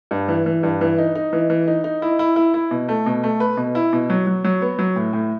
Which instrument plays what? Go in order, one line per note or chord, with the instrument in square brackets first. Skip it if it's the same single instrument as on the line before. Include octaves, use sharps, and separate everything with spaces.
[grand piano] G2
E3
E3
G2
E3
D#4
D#4
E3
E3
D#4
D#4
E4
E4
E4
E4
B2
A3
B2
A3
B4
B2
E4
B2
F#3
F#3
F#3
B3
F#3
A2
A2